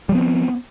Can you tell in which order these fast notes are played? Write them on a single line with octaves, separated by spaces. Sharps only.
G3 F3 B3 C4